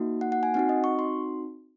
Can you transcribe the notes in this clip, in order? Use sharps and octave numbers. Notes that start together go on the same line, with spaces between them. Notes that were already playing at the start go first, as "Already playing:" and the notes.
Already playing: A#3 D#4 F#4
F#5
F#5
G#5
C4 D#4 F#4 F#5
D#5
C#6
C6